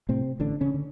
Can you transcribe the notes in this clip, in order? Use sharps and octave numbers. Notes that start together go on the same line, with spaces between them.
A2 C3 C4
A1 D3 D4
C#3 C#4
D3